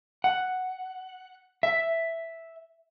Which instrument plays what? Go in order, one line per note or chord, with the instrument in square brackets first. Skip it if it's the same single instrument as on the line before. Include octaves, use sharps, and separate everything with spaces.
[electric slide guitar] F#5
E5